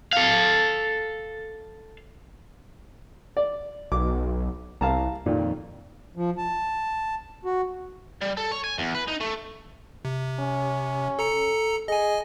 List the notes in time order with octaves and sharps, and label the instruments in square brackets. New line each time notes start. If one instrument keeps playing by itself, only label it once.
[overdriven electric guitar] A4 F5
[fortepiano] D5
[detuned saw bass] B1 [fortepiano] D6
[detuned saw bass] C2 [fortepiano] F5 A5 A#5
[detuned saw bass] F2 [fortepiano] A#2 D#3
[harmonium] F3
A5
F#4
[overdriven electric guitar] G3
A4
C#5
G#5
E2
B4
D#4
A3
[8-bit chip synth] C3
[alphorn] C#4
[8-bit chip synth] A4 A#5 C#7
[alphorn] G#4 [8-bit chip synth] D#5 G#5